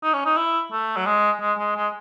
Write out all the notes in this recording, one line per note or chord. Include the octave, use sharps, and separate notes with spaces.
D#4
C#4
D#4
E4
A3
F#3
G#3
G#3
G#3
G#3